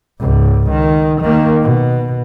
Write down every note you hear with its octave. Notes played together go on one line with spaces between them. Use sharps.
C#2 G#2
D#3
D#3 A#3
B2